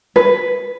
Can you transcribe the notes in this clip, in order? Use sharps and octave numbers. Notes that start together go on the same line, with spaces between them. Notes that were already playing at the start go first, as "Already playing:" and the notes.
B4